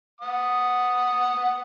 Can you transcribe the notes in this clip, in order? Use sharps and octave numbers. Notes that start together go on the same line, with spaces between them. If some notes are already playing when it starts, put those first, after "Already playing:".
F#5 D#6